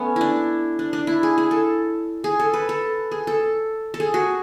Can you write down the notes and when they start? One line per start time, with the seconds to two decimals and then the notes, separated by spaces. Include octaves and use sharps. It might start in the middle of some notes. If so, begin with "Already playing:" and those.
Already playing: A3 B3 C#4
0.16 D4 E4
0.79 D4
0.93 D4
1.07 E4
1.23 G#4
1.38 G#4
1.51 A4
2.24 G#4
2.39 A4
2.54 B4
2.69 A4
3.12 G#4
3.27 A4
3.94 A4
4.00 G#4
4.14 F#4